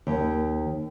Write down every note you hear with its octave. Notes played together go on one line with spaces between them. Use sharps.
D#2